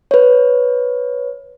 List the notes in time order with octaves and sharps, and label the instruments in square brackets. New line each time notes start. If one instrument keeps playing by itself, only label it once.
[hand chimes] B4 C#5